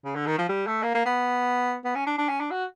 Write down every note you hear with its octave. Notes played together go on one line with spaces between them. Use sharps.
C#3
D3
D#3
F3
G3
A3
A#3
A#3
B3
B3
C#4
D4
D4
C#4
D4
F#4